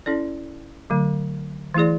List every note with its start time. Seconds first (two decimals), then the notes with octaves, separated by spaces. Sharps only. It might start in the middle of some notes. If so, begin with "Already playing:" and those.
0.06 C#4 E4 A4 D5
0.90 D3 F#3 A3
1.74 E3 A3 E4 G#4 D5